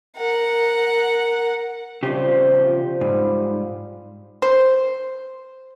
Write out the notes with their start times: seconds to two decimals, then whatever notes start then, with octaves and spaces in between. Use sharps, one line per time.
0.16 A#4 F#5
2.03 C#3 F3 G3 C4 G4
2.54 F3 G5
3.01 G#2 G3
4.42 C5